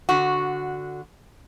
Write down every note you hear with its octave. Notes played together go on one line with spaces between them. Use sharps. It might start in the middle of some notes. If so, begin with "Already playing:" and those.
D3 F#4